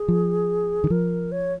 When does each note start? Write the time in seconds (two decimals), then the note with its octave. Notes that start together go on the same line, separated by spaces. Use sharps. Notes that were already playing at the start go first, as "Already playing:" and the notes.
Already playing: G#4
0.08 F3
0.84 D#3
0.90 F3 A#4
1.32 C#5